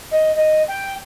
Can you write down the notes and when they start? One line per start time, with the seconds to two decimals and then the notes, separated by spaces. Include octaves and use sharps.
0.11 D#5
0.35 D#5
0.68 G5